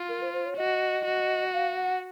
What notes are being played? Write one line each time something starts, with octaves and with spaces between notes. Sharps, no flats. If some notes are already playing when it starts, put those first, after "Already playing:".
Already playing: F4
A#4
C5
C5
C#5
F#4 D#5
F#4
F5
F#5